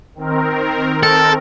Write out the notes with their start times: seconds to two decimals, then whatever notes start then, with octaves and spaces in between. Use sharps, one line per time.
0.15 D#3 C4 A#4
1.03 A4